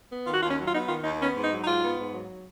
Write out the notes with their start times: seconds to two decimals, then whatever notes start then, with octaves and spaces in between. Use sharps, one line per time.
0.10 B3
0.25 D#3 F4
0.32 F#4
0.40 D#2 F4
0.49 C#4
0.57 F#3
0.66 F4
0.72 B3 D#4
0.88 D#3 F4
1.03 D#2 D#4
1.19 B3 C#4
1.35 G#2
1.43 D#4
1.51 F#3
1.61 D#4
1.66 G#2 F4
1.82 B3
1.97 G#2
2.13 F#3